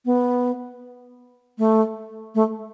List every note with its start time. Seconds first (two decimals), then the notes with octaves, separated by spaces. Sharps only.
0.05 B3
1.58 A3
2.35 A3